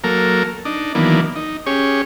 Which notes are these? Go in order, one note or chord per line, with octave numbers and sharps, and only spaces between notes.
F#3 A#3 A4 A#4
D4 D#4
D#3 E3 F#3 A#3 B3 D4
D#4
C#4 G4 G#4 C#5